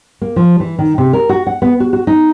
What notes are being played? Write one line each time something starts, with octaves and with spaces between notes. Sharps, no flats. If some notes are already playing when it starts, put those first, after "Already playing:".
A#3
F3
E3
D#3
C3
A#4
F#4
F#5
B3
F#4
F#4
D#4